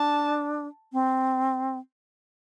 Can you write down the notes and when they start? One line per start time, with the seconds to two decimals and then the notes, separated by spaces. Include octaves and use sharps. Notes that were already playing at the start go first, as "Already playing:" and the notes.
Already playing: D4 A5
0.93 C4